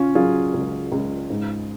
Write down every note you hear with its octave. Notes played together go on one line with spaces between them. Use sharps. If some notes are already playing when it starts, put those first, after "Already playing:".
Already playing: C#3 C#4 F4
F#3 F4 G#4
C#2
C#2
G#2